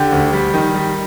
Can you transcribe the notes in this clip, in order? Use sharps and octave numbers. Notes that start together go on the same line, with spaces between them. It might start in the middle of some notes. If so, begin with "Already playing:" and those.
Already playing: D3 G4
D2
G3
D#3
G3